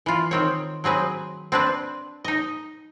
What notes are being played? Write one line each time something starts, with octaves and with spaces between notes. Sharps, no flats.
E3 F4
D#3 C4 C#5
F#3 C4 G#4 B4
C4 D4 B4
D#4 D#5